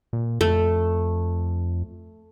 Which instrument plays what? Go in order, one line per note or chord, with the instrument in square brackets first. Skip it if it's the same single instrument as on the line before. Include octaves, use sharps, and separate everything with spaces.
[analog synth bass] A#2
[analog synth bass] F2 [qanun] A3